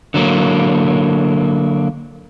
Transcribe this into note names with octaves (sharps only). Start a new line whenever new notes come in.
D3 F#3 A#3